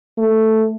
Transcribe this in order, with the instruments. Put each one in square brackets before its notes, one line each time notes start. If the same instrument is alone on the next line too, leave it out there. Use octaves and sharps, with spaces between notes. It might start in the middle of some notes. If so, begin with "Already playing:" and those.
[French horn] A3